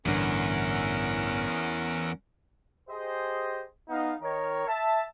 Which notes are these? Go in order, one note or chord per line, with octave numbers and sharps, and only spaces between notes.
A1 E2 G2 D3 C#4 A#4 F#5
G4 G#4 C5 D#5
B3 D#4 F5
D#3 A#4 C#5
E5 A5